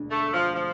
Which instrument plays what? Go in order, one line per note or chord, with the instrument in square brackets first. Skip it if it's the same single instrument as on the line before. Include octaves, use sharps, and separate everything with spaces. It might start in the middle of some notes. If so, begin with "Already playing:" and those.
Already playing: [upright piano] E1 D2 D3
[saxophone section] A3
F3
F3